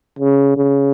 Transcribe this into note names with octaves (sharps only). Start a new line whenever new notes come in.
C#3
C#3